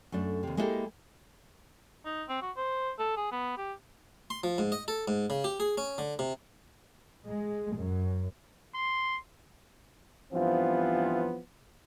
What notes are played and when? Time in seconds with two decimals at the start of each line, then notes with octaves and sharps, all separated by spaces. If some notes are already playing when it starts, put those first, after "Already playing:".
0.12 F#2 A3 D4
0.43 D#2 C3
0.57 G#3 A#3 B3 E4 G4 A4
2.05 D#4
2.29 C4
2.42 F#4
2.57 C5
2.99 A4
3.17 G#4
3.32 B3
3.57 G4
4.30 C6
4.44 F3
4.58 G#2
4.72 D#5
4.88 A4
5.08 G#2
5.30 C#3
5.44 G4
5.60 G#4
5.78 C#4
5.98 D3
6.19 C3
7.27 G#3
7.76 F#2
8.75 C6
10.33 G2 E3 F3 B3 C4 F4